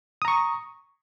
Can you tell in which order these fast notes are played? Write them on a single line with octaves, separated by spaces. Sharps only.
D#6 A#5 C#6